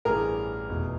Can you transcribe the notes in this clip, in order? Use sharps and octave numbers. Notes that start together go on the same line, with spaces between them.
A1 G2 E3 G3 G#4 A#4
F1 E2 B2